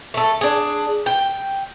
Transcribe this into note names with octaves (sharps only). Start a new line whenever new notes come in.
A3 A4
D4 G#4
G5